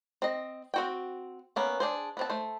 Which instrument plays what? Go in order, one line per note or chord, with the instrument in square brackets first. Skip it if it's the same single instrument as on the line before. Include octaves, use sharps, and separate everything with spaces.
[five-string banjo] C4 D#5
C4 F#4 G5
A#3 B3 C#4
D4 G#4 C5
B3 C4 A5
A3 C5